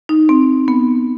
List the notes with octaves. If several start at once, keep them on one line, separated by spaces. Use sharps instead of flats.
D#4
C4
B3